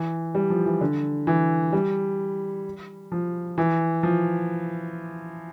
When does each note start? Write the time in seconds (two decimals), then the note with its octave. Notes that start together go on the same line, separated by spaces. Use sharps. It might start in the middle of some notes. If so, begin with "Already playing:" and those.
Already playing: E3
0.35 G3
0.50 F3
0.66 E3
0.81 D3
1.27 E3
1.73 G3
3.12 F3
3.58 E3
4.03 F3